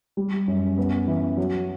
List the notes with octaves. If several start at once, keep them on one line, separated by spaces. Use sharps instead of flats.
G3
F#2
B3
E3
F#3